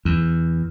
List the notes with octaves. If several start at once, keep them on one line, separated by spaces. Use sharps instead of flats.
E2